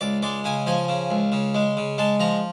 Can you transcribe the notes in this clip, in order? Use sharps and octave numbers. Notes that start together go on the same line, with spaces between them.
C#2 D5
G#3 D5
C#3 G#5
F3 G#5
C#3
C#2
C#3
G#3
C#3
G#3 A5
F3 A#5